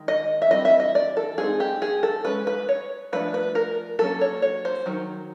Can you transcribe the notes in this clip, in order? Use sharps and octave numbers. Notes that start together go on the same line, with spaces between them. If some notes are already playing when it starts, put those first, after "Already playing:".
Already playing: D#3 G#3
D#5
E5
E3 G3 C4 D#5
E5
D#5
D5
A4
G#3 C4 D#4 G#4
G4
G#4
A4
G#3 C#4 B4
B4
C#5
F3 A3 D4 B4
B4
A#4
F#3 A#3 C#4 A4
C#5
C#5
C5
D#3 F#3